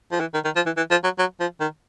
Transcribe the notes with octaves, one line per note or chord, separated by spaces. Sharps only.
F3
E3
D#3
D#3
F3
E3
E3
F3
F#3
F#3
F3
D#3